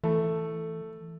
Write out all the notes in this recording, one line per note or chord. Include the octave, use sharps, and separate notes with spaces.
E3 A3